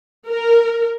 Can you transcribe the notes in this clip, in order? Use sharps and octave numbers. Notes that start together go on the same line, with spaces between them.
A#4